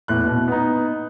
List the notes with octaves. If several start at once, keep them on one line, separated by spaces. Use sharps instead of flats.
E2 A2 F#6
B2
B3 D#4